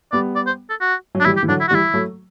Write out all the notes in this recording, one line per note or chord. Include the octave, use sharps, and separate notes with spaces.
G3 B3 D5
D5
C5
A4
F#4
F#3
D4
E3 G3 E4
G4
E3
D3 F#3 D4
E4
F#4
E3 G3
E4
F#3 A3